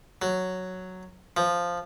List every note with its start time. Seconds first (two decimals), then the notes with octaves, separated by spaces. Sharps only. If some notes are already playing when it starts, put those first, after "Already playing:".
0.22 F#3
1.37 F3